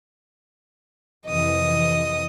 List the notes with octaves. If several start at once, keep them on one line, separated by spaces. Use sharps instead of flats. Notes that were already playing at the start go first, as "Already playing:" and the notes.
F2 C3 E3 D#5 D#6